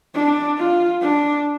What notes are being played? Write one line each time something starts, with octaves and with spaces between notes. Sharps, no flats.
D4
F4
D4